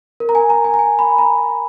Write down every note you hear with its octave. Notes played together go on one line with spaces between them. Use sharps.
A#4
A#5
G#5
A#5
G#5
A#5
G#5
B5
A#5